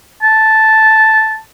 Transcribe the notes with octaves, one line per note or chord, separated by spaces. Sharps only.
A5